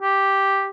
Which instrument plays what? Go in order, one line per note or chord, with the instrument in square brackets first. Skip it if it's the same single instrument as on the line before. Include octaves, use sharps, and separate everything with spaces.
[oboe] G4